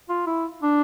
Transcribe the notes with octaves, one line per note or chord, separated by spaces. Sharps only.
F4
E4
D4